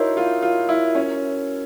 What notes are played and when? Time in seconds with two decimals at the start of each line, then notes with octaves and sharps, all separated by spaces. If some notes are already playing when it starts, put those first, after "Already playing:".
Already playing: D#4 E4 F#4 A#4 C#5
0.17 F4
0.42 F4
0.69 E4
0.95 C#4